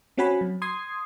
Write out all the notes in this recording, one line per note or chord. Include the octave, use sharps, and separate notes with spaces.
C4 C#4 F#4 F#5 G#5 B5
F#3
C6 D#6 G#6 C7